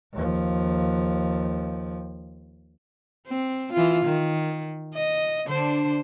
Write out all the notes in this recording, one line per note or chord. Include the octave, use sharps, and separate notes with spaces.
D#2 F3
C4
E3 F4
D#3
D#5
D3 D4 C5